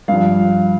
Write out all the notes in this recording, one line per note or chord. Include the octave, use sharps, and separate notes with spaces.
G2 F3 F5